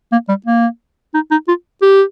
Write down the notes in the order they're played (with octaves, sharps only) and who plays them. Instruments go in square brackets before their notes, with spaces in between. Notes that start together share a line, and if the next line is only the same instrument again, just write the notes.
[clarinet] A#3
G3
A#3
D#4
D#4
F4
G4